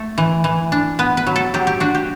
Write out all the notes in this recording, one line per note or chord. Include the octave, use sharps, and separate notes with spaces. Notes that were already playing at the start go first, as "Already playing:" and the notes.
Already playing: A3 A4
E3
E3
D4
B3 B4
B4
F#3
A4
F#3 G4
G4
D4 F#4
G4